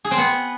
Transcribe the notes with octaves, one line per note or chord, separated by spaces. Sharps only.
G#4
C4
B3